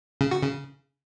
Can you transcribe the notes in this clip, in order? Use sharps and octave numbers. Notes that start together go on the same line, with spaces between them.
C#3
F#4
C#3